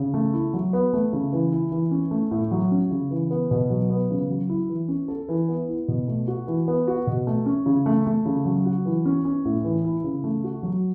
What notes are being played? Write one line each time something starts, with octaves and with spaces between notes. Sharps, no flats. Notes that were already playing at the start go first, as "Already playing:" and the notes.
Already playing: C#3
A3
E4
F#3
B3
A3
C#3
E3
E4
E3
C#4
A3
A2
F#3
C#4
C#3
E3
B3
B2
F#3
B3
C#3
F#3
E4
E3
C#4
A4
E3
B3
E4
B2
A3
F#4
E3
B3
F#4
B2
A3
C#4
C#3
A3
A3
C#3
F#3
F#4
E3
C#4
C#4
A2
E3
E4
C#3
A3
F#4
F#3